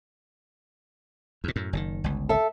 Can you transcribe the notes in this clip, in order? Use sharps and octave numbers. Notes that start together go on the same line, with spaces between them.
E2 A#2
F#2 A2
F#1 B2 D#3
G1 C#2
A4 E5